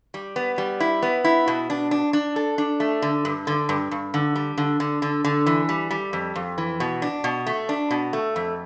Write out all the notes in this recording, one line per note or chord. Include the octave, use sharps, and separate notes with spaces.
G3
B3
G3
E4
B3
E4
B2
D4
D4
D4
A4
D4
A3
D3
G2
D3
G2
G2
D3
G3
D3
D3
D3
D3
E3
G3
G3
F2
F2
E3
B2
D4
B2
A3
D4
B2
A3
F2